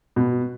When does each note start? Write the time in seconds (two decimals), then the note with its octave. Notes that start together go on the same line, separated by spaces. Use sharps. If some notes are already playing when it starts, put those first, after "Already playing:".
0.16 B2